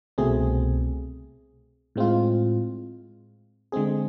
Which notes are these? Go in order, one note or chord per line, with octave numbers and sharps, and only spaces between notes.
C2 B2 A3 C4 G#4
A2 G#3 C4 F4
D3 G#3 C4 G#4